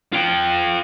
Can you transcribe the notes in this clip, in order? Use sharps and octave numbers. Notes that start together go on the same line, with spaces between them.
F4 G5